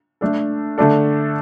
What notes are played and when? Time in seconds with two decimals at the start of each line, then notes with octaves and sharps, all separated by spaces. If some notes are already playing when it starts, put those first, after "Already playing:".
0.21 A3 D4 A4
0.78 D3 A3 D4 A4